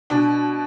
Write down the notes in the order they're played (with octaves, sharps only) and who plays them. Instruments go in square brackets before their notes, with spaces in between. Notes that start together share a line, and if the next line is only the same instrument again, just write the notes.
[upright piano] B2 D4